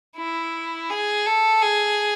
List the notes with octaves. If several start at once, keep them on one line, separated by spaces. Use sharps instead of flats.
E4
G#4
A4
G#4